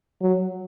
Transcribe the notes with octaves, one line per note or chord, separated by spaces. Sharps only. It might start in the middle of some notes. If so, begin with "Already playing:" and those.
F#3